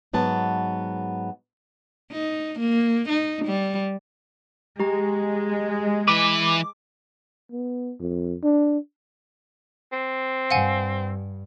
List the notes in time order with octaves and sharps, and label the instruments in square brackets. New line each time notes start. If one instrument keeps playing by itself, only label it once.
[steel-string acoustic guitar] G#2 F#3 B3 A5
[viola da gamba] D#4
A#3
D#4
G3
[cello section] G#3 [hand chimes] G4 A#5
[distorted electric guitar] E3 B4 [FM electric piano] D6
[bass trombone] B3
F2
D4
[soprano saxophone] C4
[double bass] G2 [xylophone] F5 F#5 G#5